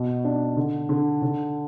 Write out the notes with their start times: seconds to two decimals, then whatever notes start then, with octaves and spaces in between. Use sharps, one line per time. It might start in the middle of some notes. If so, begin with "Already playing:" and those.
Already playing: B2
0.24 D4
0.56 D3
0.89 D3
1.22 D3